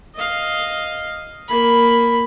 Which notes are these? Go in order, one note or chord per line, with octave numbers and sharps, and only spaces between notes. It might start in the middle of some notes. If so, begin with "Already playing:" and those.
D#5 F5
A#3 B5